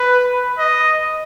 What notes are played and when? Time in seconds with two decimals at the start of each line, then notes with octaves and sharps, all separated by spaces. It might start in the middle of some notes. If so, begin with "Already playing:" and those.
Already playing: B4
0.59 D#5